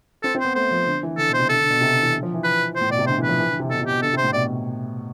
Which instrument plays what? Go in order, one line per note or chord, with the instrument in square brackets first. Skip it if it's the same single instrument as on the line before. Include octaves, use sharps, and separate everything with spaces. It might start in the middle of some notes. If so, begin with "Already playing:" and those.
[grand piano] C4 [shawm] A4
[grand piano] C4
[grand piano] B3 [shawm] C5
[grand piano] A3 [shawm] C5
[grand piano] F3
D3
E3
[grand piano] D3 [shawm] A4
[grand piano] B2
[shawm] C5
[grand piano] C3
[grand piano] D3 [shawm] A4
[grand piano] D3
B2
C3
D3
E3
D3
F3
E3
[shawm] B4
[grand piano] A2 [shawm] C5
[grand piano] B2 [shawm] D5
[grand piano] C3
[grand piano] D3 [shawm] C5
[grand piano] E3
[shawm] B4
[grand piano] F3
E3
D3
C3
[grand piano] B2 [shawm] A4
[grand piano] C3
[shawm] G4
[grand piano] B2
[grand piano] D3 [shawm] A4
[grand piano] C3
[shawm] C5
[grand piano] A2
[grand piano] B2 [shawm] D5